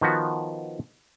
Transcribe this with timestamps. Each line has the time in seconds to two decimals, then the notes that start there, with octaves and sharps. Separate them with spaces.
0.01 D#3 F3 B3 F#4